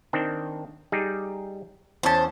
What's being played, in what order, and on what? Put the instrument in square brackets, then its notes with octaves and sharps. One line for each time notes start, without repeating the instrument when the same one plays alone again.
[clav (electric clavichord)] D#3 C4 D4
G3 D#4 G#4
[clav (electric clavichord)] E2 C#4 [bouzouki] C5 A5